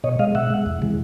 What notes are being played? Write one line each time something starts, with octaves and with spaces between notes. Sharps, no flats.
B2 C#5 D#5
G#3 D#5 F5
B2 E5 F#5
G#3
E2
C3 E3 G#3